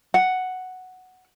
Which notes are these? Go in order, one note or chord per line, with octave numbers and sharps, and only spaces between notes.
F#5